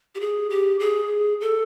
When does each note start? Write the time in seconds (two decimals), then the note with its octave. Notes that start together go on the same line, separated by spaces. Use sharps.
0.15 G4
0.20 G#4
0.50 G4
0.80 G#4
1.41 A4